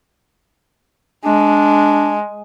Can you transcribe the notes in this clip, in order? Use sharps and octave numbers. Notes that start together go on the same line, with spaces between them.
G#3 D4